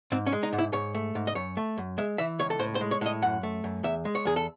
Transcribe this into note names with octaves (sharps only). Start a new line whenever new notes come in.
G#2 C4
C#4
G#3
D#4
G#2
E4
G#2 C#5
A3
G#2
D#5
F#2 C#5
A3
F#2
G#3 E5
E3 E5
C#2 C#5
A4
A2 C5
C5
G#3
C#5
A2 D#5
F#2 F#5
A3
F#2
E2 E5
G#3
C#5
E2 G#4
A4